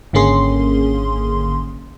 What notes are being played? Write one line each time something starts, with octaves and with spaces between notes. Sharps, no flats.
G#1 D3 A#3 C#4 G#4 C6